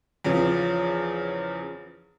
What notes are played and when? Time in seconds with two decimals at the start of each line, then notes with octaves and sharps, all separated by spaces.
0.24 E2 C#3 F3